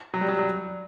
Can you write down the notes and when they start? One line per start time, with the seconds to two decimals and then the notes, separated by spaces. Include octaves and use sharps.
0.14 F#3
0.21 G3
0.29 F#3
0.39 F#3